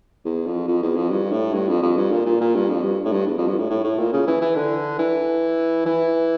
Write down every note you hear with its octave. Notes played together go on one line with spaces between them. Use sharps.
E2
F2
F2
E2
F2
G2
A2
G2
F2
F2
G2
A#2
A#2
A#2
G2
F2
G2
A2
G2
E2
F2
G2
A2
A2
A2
A#2
C#3
E3
E3
D3
E3
E3